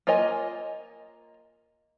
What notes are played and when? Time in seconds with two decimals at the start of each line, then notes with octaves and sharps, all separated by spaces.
0.07 A#3 F4 C#5 D#5 G#5